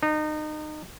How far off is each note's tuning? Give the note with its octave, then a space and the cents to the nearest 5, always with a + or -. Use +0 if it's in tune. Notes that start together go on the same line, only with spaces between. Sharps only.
D#4 -30